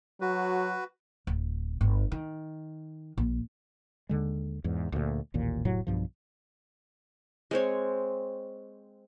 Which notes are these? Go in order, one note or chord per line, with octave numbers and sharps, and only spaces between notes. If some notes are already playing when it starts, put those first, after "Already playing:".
F#3 F#4 B4
D1
G1
D#3
A#1
D#2 D3 G#3
E2 G#2
D2 A#2
A1 D#2 A#2
F1 A2 C3 F#3
B1 G2 F3
G#3 C4 C#5